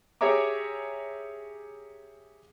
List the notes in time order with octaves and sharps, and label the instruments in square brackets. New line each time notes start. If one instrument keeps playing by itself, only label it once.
[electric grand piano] G4 G#4 C#5 E5 A#5 D6